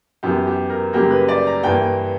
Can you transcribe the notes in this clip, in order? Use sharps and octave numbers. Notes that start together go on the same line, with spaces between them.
F#2 E3 B3 G4
G4
A#4
F#2 C#3 G3 A#3 G4
B4
D5
A#5
G2 E3 A#3 G5